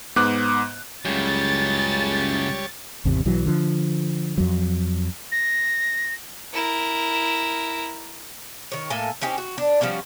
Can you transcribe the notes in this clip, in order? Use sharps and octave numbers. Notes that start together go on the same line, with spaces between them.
G#2 B3 D6 F#6
C#2 F#2 C#3 G3 C#5 A6
G#1 E2 C3
B1 E3 F#3
D3 F3
F2 F#3
A#6
E4 A#4
D#3 C#5
A2 A#3 A4 G#5
C4 C#4 D#4 G4
F#4
D4
F3 G3 C#4 F#4